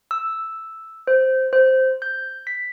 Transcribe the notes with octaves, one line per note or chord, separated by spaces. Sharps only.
E6
C5
C5
G6
B6